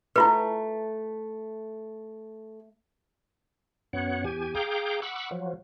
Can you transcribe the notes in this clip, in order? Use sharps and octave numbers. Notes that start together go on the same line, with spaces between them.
A3 E4 F4 B4
F#2 B3 C#5 F#5
E2 G4 G#5
G#4 F5 G5 A#5 D6 G6
F#5 B5 C#6 D6 E6
F3 F#3